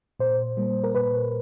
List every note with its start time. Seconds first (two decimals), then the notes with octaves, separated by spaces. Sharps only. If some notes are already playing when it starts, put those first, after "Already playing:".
0.20 A#2 C5
0.57 G3 A#3
0.84 A#4
0.95 A#2 B4